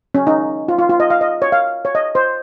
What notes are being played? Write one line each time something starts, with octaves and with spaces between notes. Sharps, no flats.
C#4
D#4
F4
F4
F4
D#5
F5
D#5
C#5
F5
C#5
D#5
C5